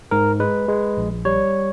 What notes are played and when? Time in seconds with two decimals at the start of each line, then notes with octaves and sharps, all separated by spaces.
0.11 G#2 A#4
0.40 G#3 B4
0.69 G#3
0.97 A#1
1.25 G3 C#5